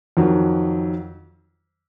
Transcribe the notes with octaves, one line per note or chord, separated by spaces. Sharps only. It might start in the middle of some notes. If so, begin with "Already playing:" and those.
F2 D#3 F#3